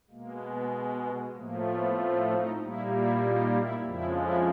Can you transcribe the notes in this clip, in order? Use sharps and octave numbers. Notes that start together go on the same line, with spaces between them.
B2 G#3 A#3
B3
B3
A2 F3 A3 A#3
B3
C4
D#4
A#2 G3 A#3 E4
E4
D#4
E4
F2 C#3 F3 G#3 E4
E4